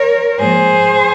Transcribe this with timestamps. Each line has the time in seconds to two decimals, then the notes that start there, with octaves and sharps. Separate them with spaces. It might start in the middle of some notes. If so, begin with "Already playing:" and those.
Already playing: A#4 C#5
0.39 G#2 F3 A#3 G#4 C5